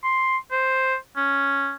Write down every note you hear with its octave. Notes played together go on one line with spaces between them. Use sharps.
C6
C5
C#4